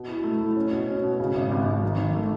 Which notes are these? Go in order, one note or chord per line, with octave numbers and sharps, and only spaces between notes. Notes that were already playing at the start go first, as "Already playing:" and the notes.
Already playing: B2
E4
A3
E4
C#4
B2
C#4
B2
C#3
G#1
G#1
G#1
D#3
D#3
A3